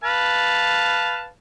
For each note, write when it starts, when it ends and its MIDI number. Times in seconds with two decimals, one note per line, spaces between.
0.04 1.27 71
0.04 1.27 77
0.04 1.27 81